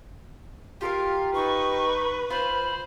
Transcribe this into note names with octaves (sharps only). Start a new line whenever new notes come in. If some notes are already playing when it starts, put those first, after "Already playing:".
F4 G4 A#4 F5
D#4 B4 C#6
F4 C5 B5